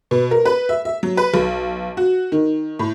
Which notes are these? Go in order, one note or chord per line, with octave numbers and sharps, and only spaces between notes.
B2
A#4
B4
E5
E5
F#3
B4
B1
F#4
D#3
A2